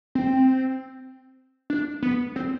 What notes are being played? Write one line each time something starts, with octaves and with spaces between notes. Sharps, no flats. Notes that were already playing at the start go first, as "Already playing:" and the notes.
C4
D4
B3
C4